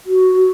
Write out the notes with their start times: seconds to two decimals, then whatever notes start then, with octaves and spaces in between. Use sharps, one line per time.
0.06 F#4